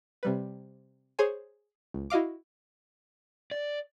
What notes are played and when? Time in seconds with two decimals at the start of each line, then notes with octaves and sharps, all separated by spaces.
0.23 C3 G3 B4
1.19 G#4 C5 C#5 G#5
1.94 C#2
2.10 E4 F#4 D#5 F5 D6
3.51 D5